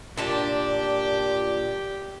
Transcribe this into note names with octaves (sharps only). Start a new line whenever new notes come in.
A#2 D4 G4 A5